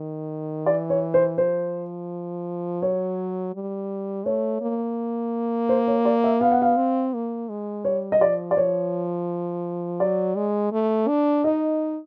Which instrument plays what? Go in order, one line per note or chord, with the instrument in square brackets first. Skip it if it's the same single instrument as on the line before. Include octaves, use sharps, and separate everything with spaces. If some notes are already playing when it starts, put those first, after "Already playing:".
Already playing: [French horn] D#3
[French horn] E3 [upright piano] D5
[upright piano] C#5
C5
[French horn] F3 [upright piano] C5
[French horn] F#3 [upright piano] C#5
[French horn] G3
[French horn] A3 [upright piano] C#5
[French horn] A#3
[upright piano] C5
C#5
D5
E5
[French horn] B3 [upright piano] F5
[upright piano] F#5
F5
[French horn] C4
A#3
G#3
[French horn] G3 [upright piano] C#5
[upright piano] D#5
[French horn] F3 [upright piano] D5
[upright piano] D5
[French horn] F3 [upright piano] C#5
[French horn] F#3 [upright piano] D5
[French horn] G#3
A3
D4
[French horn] D#4 [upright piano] D#5